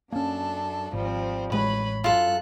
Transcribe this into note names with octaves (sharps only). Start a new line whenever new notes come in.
F#2 A#3 C#4 D4 A4
G#1 F3 G3 C4
A1 G#3 B4 C#5 B5
F#2 F4 A4 F#6